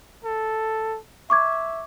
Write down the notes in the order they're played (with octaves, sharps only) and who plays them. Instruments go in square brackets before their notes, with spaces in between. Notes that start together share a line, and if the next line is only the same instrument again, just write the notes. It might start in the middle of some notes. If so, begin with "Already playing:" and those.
[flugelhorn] A4
[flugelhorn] E5 [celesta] C#6 D6 G#6